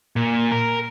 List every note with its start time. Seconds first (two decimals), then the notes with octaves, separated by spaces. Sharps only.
0.16 A#2
0.52 A#4